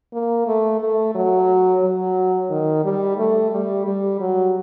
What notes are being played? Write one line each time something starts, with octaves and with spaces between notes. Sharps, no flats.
A#3
A3
A3
F#3
F#3
D#3
G3
A3
G3
G3
F#3